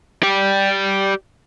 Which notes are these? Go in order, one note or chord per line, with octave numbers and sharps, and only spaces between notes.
G4 D5